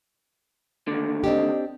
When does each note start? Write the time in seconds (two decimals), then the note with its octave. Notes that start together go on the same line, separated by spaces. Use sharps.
0.87 D#2 D3
1.24 C4 D4 G4 D#5